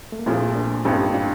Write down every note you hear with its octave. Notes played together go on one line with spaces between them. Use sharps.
A3
A#3
A#1 A#2 F3 A3 C4
A#3 D4
A1 G2 F3 C4 D#4
D4 F4